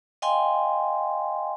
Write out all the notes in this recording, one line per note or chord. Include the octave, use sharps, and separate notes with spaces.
D#5 F5 G5 G#5 C6